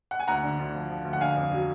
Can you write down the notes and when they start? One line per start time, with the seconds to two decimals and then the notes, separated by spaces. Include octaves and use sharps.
0.11 F#5
0.20 G#5
0.28 D2 F#5 A#5
0.43 D3
0.59 D2
0.75 F3
0.90 F3
1.05 D2
1.13 F#5
1.21 D3 F5 G#5
1.37 F2
1.52 F#3